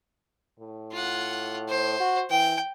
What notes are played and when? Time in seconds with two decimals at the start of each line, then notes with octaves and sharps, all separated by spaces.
0.60 A2
0.92 F4 F#5
1.69 C5
2.00 F#4
2.30 E3 G5